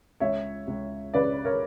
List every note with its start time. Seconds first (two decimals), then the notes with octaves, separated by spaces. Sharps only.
0.20 C#2 C#5 E5
0.68 C#2
1.14 C#3 B4 D5
1.45 A#4 C#5